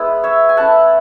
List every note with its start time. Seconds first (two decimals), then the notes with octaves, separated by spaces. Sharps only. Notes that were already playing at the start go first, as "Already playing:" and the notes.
Already playing: G#3 B3 E4
0.23 C#5 E5
0.49 G#5
0.57 A3 C#4 E4 F#5 A5